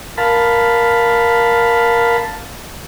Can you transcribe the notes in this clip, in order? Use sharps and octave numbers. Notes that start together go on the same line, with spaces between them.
A#4 F5 A5 B5